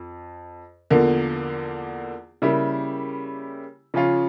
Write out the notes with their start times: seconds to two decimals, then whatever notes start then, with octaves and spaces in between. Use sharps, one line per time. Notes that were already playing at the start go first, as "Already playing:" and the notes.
Already playing: F2
0.90 E2 D3 F3 A#3
2.42 C#3 G3 A#3 E4 G4
3.94 C#3 F3 C#4 F4